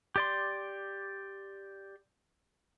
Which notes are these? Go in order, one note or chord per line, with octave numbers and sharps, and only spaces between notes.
G4 D5 C6